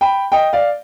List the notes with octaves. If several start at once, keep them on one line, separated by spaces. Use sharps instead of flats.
G5 B5
D#5 G5
D5 F5